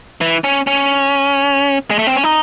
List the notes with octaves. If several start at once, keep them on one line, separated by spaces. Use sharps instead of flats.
E3
C#4
C#4
G#3
A3
C4
C#4
D#4